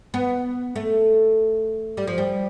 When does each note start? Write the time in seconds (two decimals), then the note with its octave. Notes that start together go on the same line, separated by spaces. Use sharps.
0.14 B3
0.76 A3
1.97 G3
2.07 F3
2.18 G3